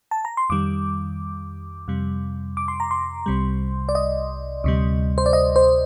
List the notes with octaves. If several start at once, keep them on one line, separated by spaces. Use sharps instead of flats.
A5
A#5
C6
F2 D#3 G3 D6
F2 C3 G3
D6
C6
A#5
C6
C2 C3 G3
D5
D#5
D2 C3 G3
C5
D5
D#5
C5